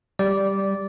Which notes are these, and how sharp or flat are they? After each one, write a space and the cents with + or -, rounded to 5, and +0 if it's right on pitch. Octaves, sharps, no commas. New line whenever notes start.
G3 +0 D5 -10